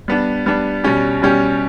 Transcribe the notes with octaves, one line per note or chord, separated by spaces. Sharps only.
G3 B3 D4
G3 B3 D4
B2 G3 C#4 G4
B2 G3 C#4 G4